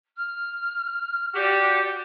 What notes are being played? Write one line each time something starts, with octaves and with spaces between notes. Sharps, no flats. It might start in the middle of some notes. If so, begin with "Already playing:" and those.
F6
F#4 G4 D5